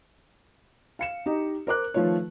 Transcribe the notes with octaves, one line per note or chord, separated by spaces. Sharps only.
F5 C#7 E7
D#4 G4 D#5
A#4 C5 D6 F#6
D#3 F3 A3 F4 B4 C#5